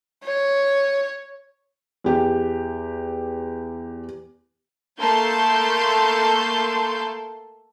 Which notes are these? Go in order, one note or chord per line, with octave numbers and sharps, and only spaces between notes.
C#5
E2 G4
A3 A#3 A4 A5 C6 G6